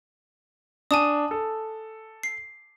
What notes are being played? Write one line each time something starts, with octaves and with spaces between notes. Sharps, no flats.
D4 G#5 A5 D#6
A4
C7